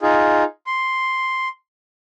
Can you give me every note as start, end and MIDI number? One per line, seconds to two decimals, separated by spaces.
0.02 0.44 63
0.02 0.44 65
0.02 0.44 68
0.67 1.48 84